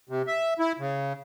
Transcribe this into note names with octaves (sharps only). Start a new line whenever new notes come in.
C3
E5
E4
C#3